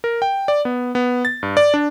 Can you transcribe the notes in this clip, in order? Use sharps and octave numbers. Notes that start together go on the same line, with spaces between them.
A#4
G5
D5
B3
B3
A6
G2
D5
D4